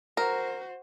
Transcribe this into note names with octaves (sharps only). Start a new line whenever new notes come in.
F#4 A#4 C5